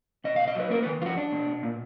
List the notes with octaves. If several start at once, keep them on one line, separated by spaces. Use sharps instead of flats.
B2 D#5
F5
B2
D#5
F#3 B4
A#3 A#4
D#3 B4
F2 F4 F#4
D4
B2
B2
A#2